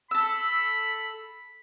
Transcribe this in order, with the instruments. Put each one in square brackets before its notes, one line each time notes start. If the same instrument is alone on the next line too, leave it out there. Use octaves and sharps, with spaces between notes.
[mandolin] A4 E6 [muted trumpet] B5